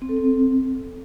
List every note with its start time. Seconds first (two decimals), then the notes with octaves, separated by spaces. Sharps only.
0.02 C4
0.09 A4
0.16 C4